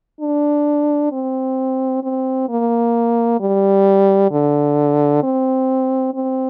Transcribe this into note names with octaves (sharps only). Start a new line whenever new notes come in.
D4
C4
C4
A#3
G3
D3
C4
C4